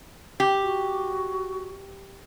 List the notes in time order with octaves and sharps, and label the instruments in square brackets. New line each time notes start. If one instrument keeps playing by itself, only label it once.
[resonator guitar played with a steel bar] G4
[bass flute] F#4